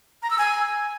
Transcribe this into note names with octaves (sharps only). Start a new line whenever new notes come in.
A#5
E6
G#5